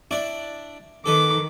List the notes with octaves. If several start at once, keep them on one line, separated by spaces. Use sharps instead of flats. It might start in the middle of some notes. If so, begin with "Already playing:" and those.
D4 E4 D5
D#3 A4 B4 D6